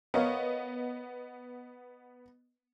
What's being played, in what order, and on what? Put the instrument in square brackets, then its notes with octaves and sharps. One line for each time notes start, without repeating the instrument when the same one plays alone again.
[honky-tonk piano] B3 D#5 [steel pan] A#4 C#5 F5